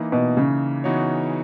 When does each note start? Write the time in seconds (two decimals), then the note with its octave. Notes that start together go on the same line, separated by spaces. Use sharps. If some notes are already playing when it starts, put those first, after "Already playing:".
Already playing: E3 A#3 D#4
0.12 B2
0.37 C#3
0.84 E3 B3 D#4 F#4 C#5